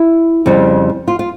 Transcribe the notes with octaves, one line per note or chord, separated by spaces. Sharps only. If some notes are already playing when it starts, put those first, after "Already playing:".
Already playing: E4
F2 C#3 G3
F4
F4